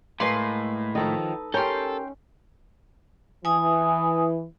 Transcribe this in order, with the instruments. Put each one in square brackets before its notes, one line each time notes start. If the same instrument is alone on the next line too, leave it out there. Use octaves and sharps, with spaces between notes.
[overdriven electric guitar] A2 [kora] G#3 A#3 [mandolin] B4 C6
[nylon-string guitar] D#3 F3 [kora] D#4 A4 D#5
[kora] C#4 [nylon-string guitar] G4 A#4 [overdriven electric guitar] A4 [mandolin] G5 C6
[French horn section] E3 [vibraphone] G#5 D#6